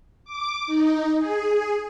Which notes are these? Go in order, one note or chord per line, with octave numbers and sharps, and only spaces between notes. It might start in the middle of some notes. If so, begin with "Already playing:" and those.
D6
D#4
G#4